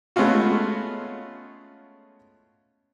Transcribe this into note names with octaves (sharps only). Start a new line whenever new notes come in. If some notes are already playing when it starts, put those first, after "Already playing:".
G#3 A3 B3 C#4 F4 F#4